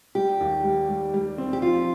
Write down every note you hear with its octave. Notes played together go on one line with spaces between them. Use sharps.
G3 G4
D#2
G3
G3
G3
C4
G4
F3 F4